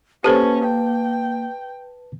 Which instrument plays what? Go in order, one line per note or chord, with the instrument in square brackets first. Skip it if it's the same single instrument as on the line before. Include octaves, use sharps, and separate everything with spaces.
[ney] A#3 [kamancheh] C#4 [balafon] G4 A4 C5 [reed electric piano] B4 A5
[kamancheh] G5